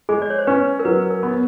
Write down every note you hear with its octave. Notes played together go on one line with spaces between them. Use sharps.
G#3 G#4
D5
C#5
C5
C#4 B4
A#4
F#3 B4
A#4
B3